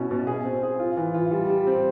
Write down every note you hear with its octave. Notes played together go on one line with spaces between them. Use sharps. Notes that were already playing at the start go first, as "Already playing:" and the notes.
Already playing: B2 C#4 E4
B2
G#4
C4
G#4
F4
E3
F4
G3
G3
C4